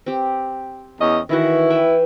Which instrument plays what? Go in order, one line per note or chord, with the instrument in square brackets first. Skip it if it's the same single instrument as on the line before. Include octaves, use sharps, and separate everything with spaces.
[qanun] C4 G4
[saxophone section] E2 C#4 D#5
[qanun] D#3 E3 F#4 [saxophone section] E4
[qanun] B4 E5 G5